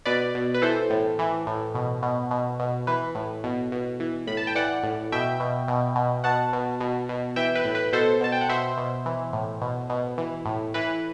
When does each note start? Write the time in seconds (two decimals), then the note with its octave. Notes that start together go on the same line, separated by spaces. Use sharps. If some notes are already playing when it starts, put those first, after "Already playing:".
0.05 B2 B4 D5
0.35 B2
0.54 B4
0.62 E3 A4 C5
0.90 A2
1.19 E3
1.47 A2
1.75 B2
2.02 B2
2.31 B2
2.59 B2
2.87 E3 B4
3.15 A2
3.44 B2
3.72 B2
4.00 E3
4.27 A2 B5
4.37 A5
4.47 G5
4.55 E3 D5 F#5
4.83 A2
5.12 B2 E5 G5
5.40 B2
5.68 B2
5.96 B2
6.24 B2 F#5 A5
6.53 B2
6.80 B2
7.09 B2
7.36 E3 E5 G5
7.55 B4
7.65 A2
7.75 B4
7.93 B2 A4 C5
8.21 B2 A5
8.32 G5
8.41 F#5
8.49 B2 C5 E5
8.77 B2
9.06 E3
9.33 A2
9.61 B2
9.90 B2
10.18 E3
10.46 A2
10.74 E3 B4